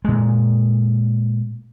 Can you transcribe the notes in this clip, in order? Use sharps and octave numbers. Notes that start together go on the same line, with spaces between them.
A#2 G#3